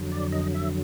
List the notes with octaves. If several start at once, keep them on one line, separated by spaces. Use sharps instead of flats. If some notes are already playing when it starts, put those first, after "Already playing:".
Already playing: F2 D3 F#3
D5
D#5
E5